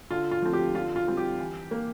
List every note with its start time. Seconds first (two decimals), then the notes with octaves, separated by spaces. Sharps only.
0.10 D3 F4
0.31 F4
0.42 F3 A3 C4
0.53 G4
0.74 D3 F4
0.96 F4
1.07 G3 C4
1.17 G4
1.39 E3
1.71 A#3